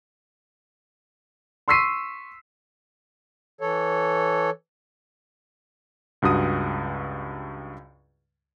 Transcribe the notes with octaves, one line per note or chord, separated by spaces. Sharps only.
C6 C#6 E6 B6 C7 D#7
E3 A4 C#5
C#2 G2 F#4 D#6 D#7